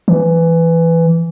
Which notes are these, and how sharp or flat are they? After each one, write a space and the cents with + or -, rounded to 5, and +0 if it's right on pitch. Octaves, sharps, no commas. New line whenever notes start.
E3 +10